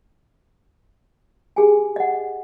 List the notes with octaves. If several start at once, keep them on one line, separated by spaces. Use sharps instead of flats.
G4 G#4 G#5
D#5 F#5